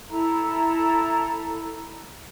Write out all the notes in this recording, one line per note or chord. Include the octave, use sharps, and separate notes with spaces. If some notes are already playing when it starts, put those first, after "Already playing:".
E4 A4 A#5